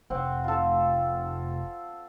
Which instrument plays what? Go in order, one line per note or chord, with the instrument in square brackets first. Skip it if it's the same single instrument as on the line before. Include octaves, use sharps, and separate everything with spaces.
[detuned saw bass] F1 [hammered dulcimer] C4 F#5
[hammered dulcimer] F4 A4